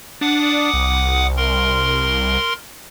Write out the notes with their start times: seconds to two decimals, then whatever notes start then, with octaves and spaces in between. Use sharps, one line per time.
0.21 D4 F#5 D6 D#6
0.74 C2
1.37 A#4 C6